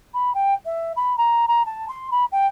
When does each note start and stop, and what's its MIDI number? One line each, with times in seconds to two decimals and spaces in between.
0.14 0.33 83
0.34 0.54 79
0.65 0.92 76
0.96 1.16 83
1.17 1.45 82
1.48 1.65 82
1.65 1.85 81
1.88 2.07 84
2.11 2.24 83
2.32 2.47 79